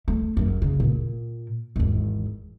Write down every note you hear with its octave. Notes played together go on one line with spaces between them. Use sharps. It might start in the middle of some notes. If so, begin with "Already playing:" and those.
A3
F#1 F#2
C#3
A#2 A#3
G#1 E2